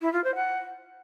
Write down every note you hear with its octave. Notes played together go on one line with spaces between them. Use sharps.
E4
F4
C5
F#5